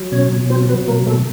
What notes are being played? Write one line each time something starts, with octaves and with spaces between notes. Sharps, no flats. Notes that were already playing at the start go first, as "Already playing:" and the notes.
Already playing: F#3
B2 C#4 C#5
B2
F#3 C4 C5
F#3 B3 B4
B2 A#3 A#4
B2 A3 A4